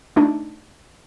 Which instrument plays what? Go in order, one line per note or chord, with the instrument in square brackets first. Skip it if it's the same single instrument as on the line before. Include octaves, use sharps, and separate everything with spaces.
[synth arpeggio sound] A3 D4 D#4